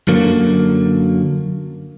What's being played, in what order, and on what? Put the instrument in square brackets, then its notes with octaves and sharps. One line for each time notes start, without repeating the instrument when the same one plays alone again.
[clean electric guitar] F#2 D3 F#3 A#3